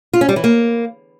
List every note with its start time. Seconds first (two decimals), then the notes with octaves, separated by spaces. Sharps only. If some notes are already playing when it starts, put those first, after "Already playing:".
0.13 F4
0.21 C#4
0.29 G3
0.36 E3
0.44 A#3